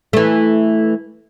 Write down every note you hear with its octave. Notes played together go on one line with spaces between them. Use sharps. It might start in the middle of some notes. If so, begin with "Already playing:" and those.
E3 A3